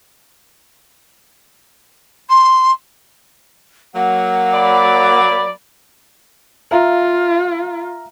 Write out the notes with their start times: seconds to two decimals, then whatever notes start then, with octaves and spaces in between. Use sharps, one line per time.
2.29 C6
3.95 F#3 A#3 F#5
4.54 D5 B5
6.71 F4 E5 F5 A#5